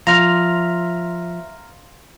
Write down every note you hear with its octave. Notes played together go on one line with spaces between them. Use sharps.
F3 E5 F5 A#5 C6 F6 F7